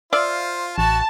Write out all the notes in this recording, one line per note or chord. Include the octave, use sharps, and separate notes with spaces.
F4 C5 D5 E5 F5
A1 F#4 A5